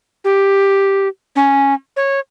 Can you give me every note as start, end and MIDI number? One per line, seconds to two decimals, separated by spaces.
0.25 1.08 67
1.36 1.74 61
1.97 2.20 73